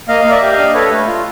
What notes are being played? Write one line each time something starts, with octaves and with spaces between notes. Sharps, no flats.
A#3 D#5 F5
A#3 F5
D5 E5
G4
D#5 F5
D4
A4 B4 C#5
A3
F4